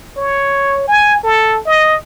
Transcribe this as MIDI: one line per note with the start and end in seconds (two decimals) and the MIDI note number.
0.17 0.85 73
0.87 1.20 80
1.23 1.60 69
1.66 1.96 75